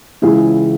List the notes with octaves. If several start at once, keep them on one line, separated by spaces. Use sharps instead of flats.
C#2 C#3 E3 E4 G#4